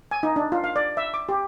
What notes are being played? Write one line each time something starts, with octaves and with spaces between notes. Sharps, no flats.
G#5
D#4
D4
F4
F5
D5
E5
D6
G4